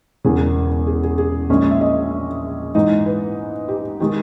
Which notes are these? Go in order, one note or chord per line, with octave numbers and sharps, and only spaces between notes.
E1 E2 C#3 G#4
G#4
G#4
G#4
A#1 A#2 G#3 C#4
E5
D#5
G#2 E3 G#3 D#4
B4
G4
D#3 G#3 G4